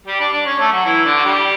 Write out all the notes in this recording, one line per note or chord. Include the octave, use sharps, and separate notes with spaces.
G3 G4
D4 D5
D4 D5
C#4 C#5
A3 A4
F#3 F#4
E3 E4
D3 D4
F#4
G3 G4